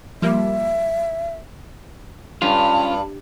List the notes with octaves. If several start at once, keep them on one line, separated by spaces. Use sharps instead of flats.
F3 G3 A#3 E5
G2 C#4 F4